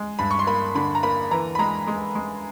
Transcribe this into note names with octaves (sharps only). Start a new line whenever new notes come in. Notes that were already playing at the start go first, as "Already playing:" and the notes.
Already playing: G#3
G2 B5
C#6
C6
A#3 B5
D3 B5
A#5
A#3 B5
E3 A#5
B5
G#3 A#5
G#3
G#3